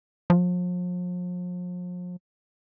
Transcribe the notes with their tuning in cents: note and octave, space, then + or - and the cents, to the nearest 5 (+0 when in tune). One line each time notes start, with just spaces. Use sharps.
F3 +40